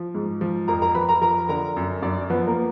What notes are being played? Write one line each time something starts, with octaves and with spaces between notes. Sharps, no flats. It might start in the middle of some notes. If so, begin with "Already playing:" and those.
Already playing: F3
G#2
F3
F2 A#4 A#5
A#4 A#5
F2 B4 B5
A#4 A#5
F3 A#4 A#5
D3 A#4 A#5
F#2
F#2 D4 D5
F3 B3 B4
A#3 A#4